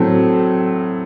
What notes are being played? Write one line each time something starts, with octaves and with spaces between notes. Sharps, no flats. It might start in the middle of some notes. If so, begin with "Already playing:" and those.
Already playing: A2 F#3 A3 C4